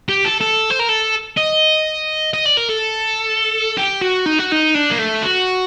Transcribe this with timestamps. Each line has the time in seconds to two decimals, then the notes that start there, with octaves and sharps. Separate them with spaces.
0.09 G4
0.25 A4
0.41 A4
0.70 C5
0.80 A#4
0.89 A4
1.37 D#5
2.33 D#5
2.45 D5
2.57 A#4
2.69 A4
3.78 G4
4.02 F#4
4.26 D#4
4.39 F#4
4.52 D#4
4.74 D4
4.90 A#3
4.98 A3
5.22 F#4